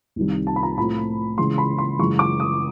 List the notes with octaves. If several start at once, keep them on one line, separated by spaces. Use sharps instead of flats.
C2 C3 D#3 G3
A5
B5
A#5
A2 F3 A3 C4 B5
C#3 E3 G#3 C6
B5
C6
F#2 C#3 E3 G#3 C#6
D6
D#6